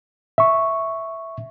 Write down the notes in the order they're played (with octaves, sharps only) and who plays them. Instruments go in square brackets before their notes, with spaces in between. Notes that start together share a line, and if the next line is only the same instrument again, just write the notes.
[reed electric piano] E5 C#6